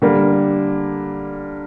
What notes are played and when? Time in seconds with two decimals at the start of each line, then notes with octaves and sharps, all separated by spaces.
0.02 D3 G3 A#3